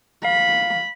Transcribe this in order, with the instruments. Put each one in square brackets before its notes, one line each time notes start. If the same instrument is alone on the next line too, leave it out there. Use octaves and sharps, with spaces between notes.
[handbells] F5 [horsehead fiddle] B5